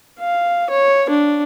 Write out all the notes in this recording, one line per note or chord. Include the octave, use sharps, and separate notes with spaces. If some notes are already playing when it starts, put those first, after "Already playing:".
F5
C#5
D4